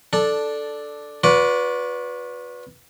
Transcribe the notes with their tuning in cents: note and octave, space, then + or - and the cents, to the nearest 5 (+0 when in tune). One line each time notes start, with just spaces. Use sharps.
D4 +0 A4 +0
F#4 -40 B4 +0 D5 -30